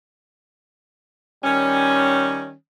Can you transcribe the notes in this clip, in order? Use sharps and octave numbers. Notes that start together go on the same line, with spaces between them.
D#3 G3 C#4